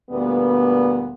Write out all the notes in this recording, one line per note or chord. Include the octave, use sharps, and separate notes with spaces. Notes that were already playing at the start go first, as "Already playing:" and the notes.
D2 A#2 G3 B3